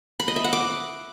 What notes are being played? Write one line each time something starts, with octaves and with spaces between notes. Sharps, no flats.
B5
D#5
E5
F#5
D6